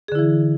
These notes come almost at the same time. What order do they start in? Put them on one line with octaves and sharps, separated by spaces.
G#4 D3 E4 E3